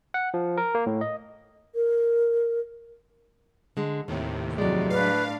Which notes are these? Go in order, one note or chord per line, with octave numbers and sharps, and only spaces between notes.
F#5
F3
A#4
A#3
A2
D#5
A#4
D3 G#3
D#2 A2 C3 D#3
F2 F#3 G#3 D5
A2 D4 B4 F5